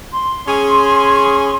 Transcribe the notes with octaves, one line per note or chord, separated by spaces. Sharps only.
C6
C#4 G#4